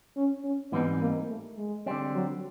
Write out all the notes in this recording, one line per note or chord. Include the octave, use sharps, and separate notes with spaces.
C#4
C#4
G#2 E3 G3 B3 C4 D#4
A#3
A3
G#3
D3 G3 C4
F#3